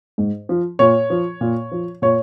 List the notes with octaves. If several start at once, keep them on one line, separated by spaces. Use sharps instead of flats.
G#2
F3
A#2 C#5
F3
A#2
F3
A#2 C#5